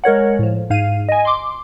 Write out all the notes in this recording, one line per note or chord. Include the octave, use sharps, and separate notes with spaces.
G#3 A#4 C#5 F#5
A2 F3
G#2 F5 D#7
D#5 G#5
C6 D6